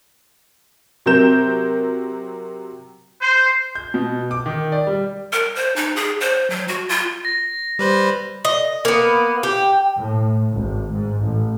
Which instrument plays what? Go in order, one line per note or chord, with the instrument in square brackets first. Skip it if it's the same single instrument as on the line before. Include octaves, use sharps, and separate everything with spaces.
[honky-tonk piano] C3 F#3 A#4 G6 E7
[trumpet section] C5
[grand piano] G6
B2
D6
D#3
D5
G3
[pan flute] A#4
C5
D#4
G#4
C5
F#3
F#4
F4
[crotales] A#6
[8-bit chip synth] G3 B4 C5
[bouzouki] D#5
A#3 B3
G4
[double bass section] A2
G#1
G#2
A1